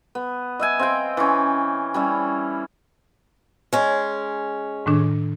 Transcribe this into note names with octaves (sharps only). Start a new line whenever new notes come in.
B3
D#5 E5 G#5
C4 F5 G5
E3 C#4
G3 C#4 E4
G#3 C#4
A2 D#3 D4